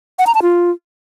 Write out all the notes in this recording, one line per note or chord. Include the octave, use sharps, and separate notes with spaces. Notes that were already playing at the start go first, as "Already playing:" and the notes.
F#5
A#5
A5
F4